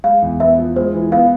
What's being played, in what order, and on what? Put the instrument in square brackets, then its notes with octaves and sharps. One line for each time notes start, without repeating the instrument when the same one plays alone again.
[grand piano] G#3 [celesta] F5
[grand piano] E2
[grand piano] B3 [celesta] E5
[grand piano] F3
[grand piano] G#3 [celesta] C5
[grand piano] E3
[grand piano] B3 [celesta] F5